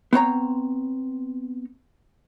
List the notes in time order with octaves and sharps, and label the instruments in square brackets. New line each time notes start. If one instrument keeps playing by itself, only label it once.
[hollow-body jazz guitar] B3 C4 C#5 A#5